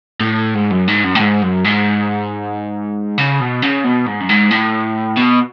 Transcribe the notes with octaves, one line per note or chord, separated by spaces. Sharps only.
A2
G#2
F#2
G#2
F#2
A2
G#2
F#2
G#2
C#3
B2
C#3
B2
G#2
F#2
G#2
A2
B2